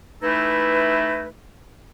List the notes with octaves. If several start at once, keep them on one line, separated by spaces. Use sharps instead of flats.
E3 A3 D#4 E4 A4 B4